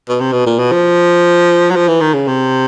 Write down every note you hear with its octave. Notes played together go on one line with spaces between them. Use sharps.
B2
C3
B2
A#2
B2
F3
F#3
F3
E3
D#3
C#3
C3